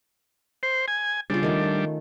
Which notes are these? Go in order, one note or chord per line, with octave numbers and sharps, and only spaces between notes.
C5
G#5
C#3 G3 C#4 D4 F4
D#3 A3 F4